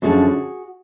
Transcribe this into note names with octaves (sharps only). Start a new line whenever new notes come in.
F#2 D3 F3 F#4 G#4